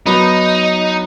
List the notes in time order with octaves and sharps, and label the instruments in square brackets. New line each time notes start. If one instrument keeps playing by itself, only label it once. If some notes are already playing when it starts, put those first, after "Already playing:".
[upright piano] F#3 B3 [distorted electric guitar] D#4